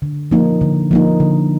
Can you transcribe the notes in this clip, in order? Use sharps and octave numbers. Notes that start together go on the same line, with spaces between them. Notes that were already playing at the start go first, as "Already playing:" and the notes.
D3
F3 A#3 D#4
D3
F3 A#3 D#4
D3